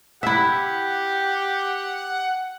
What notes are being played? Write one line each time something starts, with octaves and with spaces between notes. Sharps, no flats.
E4 G4 E5 F#5